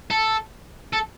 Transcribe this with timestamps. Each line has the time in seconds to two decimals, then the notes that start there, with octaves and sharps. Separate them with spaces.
0.10 A4
0.93 A4